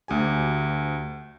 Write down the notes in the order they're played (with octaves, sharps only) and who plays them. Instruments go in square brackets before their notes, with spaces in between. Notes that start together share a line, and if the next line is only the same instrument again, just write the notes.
[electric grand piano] D2 G4 G#5